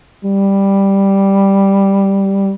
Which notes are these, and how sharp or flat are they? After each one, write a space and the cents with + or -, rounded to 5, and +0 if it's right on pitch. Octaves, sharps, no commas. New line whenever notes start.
G3 +0